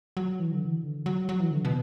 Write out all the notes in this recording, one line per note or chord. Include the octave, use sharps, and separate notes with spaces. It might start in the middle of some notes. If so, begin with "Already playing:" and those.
F#3
E3
D3
E3
D3
F#3
F#3
E3
D3
B2